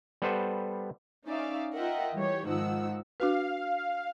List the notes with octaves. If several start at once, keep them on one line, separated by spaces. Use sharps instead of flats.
G3 B3 A4 B4 C5
C#4 D#4 D5 E5 F5
F4 A#4 D#5 E5 F#5 G5
E3 G3 G4 C#5
G#2 D#3 F3 D#4 F#5 E6
D4 F#4 B4 F5